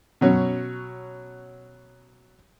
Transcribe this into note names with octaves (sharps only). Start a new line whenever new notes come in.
B2 F#3 C#4